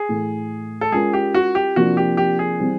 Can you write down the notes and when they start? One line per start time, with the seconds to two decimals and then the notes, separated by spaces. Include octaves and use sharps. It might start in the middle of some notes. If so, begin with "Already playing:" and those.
Already playing: G#4
0.09 A2 E3 A3
0.81 A4
0.92 G#3 C#4 F4 G#4 A#4
1.13 G4
1.34 F#4
1.55 G4
1.76 C3 F3 A#3 D4 F#4
1.97 G4
2.17 G4
2.39 G#4
2.59 E3 G3 C4